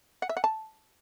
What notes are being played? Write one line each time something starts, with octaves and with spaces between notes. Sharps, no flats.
F#5
E5
F#5
A5